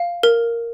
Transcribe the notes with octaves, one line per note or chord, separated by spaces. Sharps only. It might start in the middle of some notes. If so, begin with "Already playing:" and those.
Already playing: F5
A#4